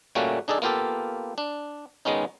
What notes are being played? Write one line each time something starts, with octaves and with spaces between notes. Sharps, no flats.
A#2 G3 A3 A#3 C#4 F#4
D4 D#4 G#4 A4 D5
A#3 B3 F4 G4 A4
D4
D#3 G#3 B3 C#4 D#4